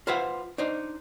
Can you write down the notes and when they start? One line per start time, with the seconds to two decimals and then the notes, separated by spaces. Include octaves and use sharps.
0.07 F4 B4 C5 E5 F#5
0.58 D4 D#4 C5